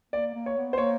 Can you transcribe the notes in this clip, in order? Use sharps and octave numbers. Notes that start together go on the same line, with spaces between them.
A#3 D5
A#3
C#5
B3
C5
A#3 C#5